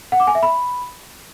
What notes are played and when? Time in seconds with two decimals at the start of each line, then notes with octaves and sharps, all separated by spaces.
0.12 F#5
0.20 D6
0.27 G#5
0.35 E5
0.43 B5